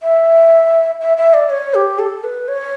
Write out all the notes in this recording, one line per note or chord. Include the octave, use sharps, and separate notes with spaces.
E5
E5
E5
D5
C#5
G4
A4
B4
C#5